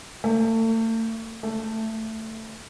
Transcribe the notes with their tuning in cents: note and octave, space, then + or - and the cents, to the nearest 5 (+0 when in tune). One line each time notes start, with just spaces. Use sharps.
A3 +40
A3 +10